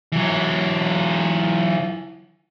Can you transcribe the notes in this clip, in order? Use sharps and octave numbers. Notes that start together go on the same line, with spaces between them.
E3 F#3